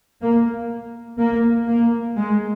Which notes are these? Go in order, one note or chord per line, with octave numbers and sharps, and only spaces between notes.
A#3
A#3
A#3
G#3